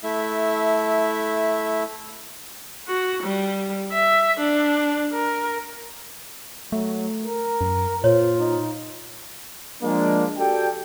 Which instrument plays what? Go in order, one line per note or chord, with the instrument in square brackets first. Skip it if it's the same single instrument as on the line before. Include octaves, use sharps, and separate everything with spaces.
[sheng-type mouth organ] A3 E4 E5
[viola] F#4
G3
E5
D4
A#4
[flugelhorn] F#3 [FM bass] A3
[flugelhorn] A#4
[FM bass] F#2
[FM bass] A#2 [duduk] F4 [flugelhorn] C5 [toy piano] C#5
[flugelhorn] D#4
[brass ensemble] F3 G#3 A#3 D4
F#4 G4 A4 D5 G5